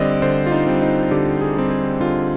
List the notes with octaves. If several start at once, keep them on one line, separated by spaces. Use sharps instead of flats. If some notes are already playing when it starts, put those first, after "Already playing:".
Already playing: D3 G3 C4 D5 D#5
D3 C5
F4
D#4
G3 C4
D#4
D3 G4
G#4
G3 C4
G#4
D3 F4